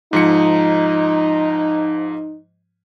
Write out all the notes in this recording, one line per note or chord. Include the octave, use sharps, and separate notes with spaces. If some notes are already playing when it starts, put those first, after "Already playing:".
G#2 F3 D#4 C#7